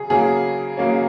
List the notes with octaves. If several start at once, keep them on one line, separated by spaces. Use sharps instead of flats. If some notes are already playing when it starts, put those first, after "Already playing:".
Already playing: C#3 F#3 G#4
C#3 F#3 A#3 C#4 G#4
C#3 F#3 A#3 C#4